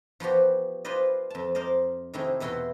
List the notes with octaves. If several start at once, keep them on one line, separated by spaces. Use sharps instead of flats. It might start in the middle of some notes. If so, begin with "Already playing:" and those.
F3 B3 F#4 G4
F4 G#4 B4 C5 D5 D#5
F2 A5
A#4 C5 D5 D#5
C3 D#3 A3 E4 G#4
E2 B2 E4 F#4 G5 C6